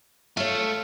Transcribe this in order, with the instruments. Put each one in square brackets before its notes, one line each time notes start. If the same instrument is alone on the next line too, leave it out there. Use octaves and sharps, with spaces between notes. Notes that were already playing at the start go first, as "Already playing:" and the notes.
[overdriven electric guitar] A3 [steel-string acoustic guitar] F4 C#5